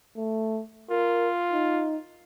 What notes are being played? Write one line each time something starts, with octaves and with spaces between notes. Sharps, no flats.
A3
F4 A#4
D#4